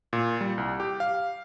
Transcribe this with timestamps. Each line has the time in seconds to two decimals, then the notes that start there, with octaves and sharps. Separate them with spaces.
0.13 A#2
0.41 G3
0.58 C2
0.80 G4
1.00 F5